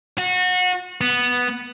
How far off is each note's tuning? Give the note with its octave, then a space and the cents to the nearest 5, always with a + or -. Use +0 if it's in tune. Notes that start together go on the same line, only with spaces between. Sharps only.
F#4 -25
B3 -5